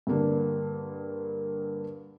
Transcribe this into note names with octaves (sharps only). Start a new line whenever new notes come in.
G2 D3 A#3 D4